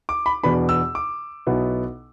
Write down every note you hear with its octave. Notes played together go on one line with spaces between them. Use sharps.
D6
B5
E2 B2 B3 D4 B5
E6
D6
B1 B2 B3 E4